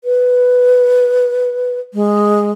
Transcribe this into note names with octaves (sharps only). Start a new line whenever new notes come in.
B4
G#3